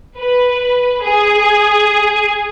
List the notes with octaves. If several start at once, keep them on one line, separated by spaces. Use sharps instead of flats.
B4
G#4